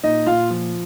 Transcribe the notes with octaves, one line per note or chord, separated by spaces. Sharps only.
A#2 D#4 D#5
A#2 F4 F5
F3